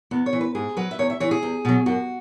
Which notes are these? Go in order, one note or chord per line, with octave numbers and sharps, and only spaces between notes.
E2 B3
C#5
E3
B4
G#2 G#4
F#3 B4
E5
E2 C#5
E5
E3 C#5
G#4
E2
B2 F#3
F#2 F#4